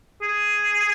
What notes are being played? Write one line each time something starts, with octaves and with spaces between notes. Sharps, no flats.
G#4